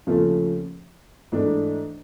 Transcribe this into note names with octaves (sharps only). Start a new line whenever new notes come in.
D#2 C#3 F3 A3
G#2 E3 A3 D4